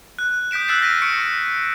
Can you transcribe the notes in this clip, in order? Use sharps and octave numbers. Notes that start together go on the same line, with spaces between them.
F#6
D#6 G6 B6 D7 E7
E6 F#6 G6 A6 C7 E7
F6 A#6 B6 D7 D#7
C#6 C#7 D7